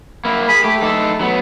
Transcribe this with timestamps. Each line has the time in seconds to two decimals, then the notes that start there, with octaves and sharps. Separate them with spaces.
0.25 A#3 E4
0.49 G#4 B5
0.64 A3 G4
0.83 D#4 A4
1.21 F#3 B3